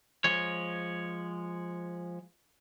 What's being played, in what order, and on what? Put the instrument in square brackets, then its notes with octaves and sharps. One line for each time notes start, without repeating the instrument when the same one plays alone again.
[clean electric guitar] F3 G#3 C#5